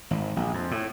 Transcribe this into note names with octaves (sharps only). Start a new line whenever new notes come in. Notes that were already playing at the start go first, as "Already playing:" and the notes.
G#1
A#1
F2
A2